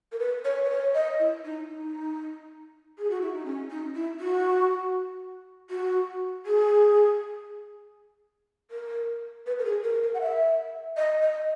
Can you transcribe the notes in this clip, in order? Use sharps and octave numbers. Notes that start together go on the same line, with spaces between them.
A#4
B4
C#5
B4
C#5
D#5
E4
D#4
D#4
G#4
F#4
E4
D#4
C#4
D#4
E4
F#4
F#4
G#4
A#4
B4
A#4
G#4
A#4
A#4
F#5
E5
D#5
D#5